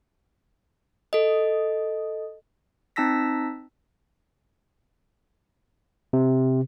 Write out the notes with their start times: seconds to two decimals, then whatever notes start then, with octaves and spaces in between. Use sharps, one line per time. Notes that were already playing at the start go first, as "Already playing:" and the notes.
1.13 A4 D#5
2.96 C4 D#4 A5 E6 A#6 B6
6.13 C3